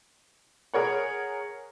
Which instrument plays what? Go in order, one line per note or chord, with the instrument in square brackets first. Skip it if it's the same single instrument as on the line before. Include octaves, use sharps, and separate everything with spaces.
[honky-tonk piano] G#4 A#4 C#5 F#5